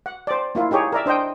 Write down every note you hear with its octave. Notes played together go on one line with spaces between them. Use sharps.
F#5
C5 D5
A#3 E4 F4
D#4 G4 G#4 C#5
A#4 D5 E5
D4 C5 D#5 G5